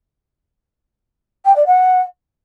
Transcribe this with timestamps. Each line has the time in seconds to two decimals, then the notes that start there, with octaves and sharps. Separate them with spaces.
1.45 G5
1.56 D5
1.66 F#5